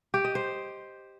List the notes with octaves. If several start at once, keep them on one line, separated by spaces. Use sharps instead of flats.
G4
D#5
C5